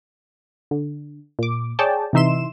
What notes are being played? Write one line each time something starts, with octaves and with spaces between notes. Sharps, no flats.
D3
A#2 D6
G#4 C#5 D5 G5 A5
C3 E3 D#4 E5 C6 E7